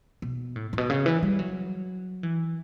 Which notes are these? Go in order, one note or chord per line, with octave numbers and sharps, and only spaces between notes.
B2
A2
A2
B2
C#3
E3
G3
F#3
E3